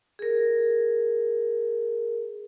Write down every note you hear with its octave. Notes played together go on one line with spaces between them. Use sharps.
G#4 A#4